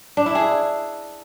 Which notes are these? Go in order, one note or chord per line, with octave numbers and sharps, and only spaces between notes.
D4
E4
G#4